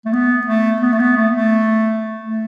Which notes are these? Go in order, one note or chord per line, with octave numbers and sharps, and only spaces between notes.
A3
B3
A3
B3
A3
B3
A3
A3
A3